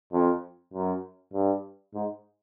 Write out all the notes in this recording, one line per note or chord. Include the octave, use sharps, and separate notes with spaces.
F2
F#2
G2
G#2